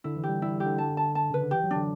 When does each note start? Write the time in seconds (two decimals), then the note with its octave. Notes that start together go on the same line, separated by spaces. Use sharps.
0.04 D3 E4
0.17 E3
0.23 G4
0.29 G3
0.42 G3 E4
0.60 G4
0.65 D3
0.78 A5
0.97 A5
1.15 A5
1.30 C#3 B4
1.40 D3
1.51 E3 G4
1.64 F#3
1.71 D4
1.76 D3